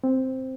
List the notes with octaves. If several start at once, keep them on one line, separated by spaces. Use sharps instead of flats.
C4